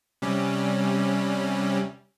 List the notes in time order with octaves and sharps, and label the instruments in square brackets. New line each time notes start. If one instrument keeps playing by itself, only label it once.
[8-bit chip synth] C3 G3 C#4